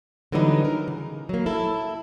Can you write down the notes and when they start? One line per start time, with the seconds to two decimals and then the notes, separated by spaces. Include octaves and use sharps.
0.32 D3 E3 F#3 G3 B3 D#4
0.65 A#4
0.88 C#3
1.29 F#3 A#3
1.46 E4 A4